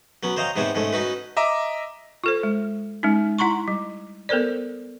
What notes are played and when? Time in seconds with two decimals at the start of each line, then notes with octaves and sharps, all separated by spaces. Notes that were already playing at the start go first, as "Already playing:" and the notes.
0.23 F#3 B3 C#4
0.37 C5 C#5 D#5 F5 G5 A#5
0.56 G#2 C3 B3 C5 C#5 G#5
0.75 G#2 G#3 A3 C#4
0.93 C#4 D#4 F#4 B4
1.37 D#5 E5 A#5 D6
2.24 F4 A4 C5
2.43 G#3
3.03 G#3 C#4 D#4
3.39 E4 F#5 A#5 C6 C#6
3.68 G3
4.29 B3 A4 A#4 C5 D5